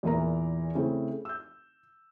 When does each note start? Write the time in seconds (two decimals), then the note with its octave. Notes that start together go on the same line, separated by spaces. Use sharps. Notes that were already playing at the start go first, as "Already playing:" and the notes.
0.03 E2 A#2 E3 A#4 A#5
0.75 C#3 A3 C4 E4
1.25 E6 G6